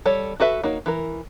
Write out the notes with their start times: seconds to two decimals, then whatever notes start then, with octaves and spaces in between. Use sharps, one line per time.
0.06 G3 A4 C#5
0.40 F#4 A4 B4 E5
0.63 A#3 D#4 F#4 C#5
0.86 E3 A#4